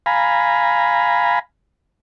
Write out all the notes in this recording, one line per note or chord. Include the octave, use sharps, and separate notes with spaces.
F5 G#5 A#5 B5